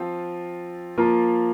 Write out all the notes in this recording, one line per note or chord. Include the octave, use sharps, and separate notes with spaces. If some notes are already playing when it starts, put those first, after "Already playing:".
Already playing: F3 C4 F4
F3 A#3 F4 A#4